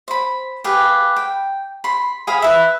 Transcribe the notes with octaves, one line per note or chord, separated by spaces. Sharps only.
C5 B5
G4 G#4 B4 F5
G5
B5 C6
G#4 F5 G#5 B5
B4 E5